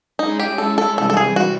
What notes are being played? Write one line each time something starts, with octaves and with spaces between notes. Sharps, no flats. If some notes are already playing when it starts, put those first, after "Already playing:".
G#3 C#4 D#4 E4 G#4
G4
A4
A4
C3 E3 G3 A4
A4
G#4
F#4